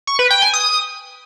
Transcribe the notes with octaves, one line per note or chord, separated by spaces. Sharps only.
C#6
B4
G5
G#5
D#6